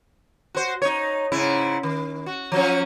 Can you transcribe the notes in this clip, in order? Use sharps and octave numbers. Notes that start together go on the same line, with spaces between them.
F#4 C5
D#4 C#5
G#2 C#3 E4
D#3
F#4
F3 F#3 C#4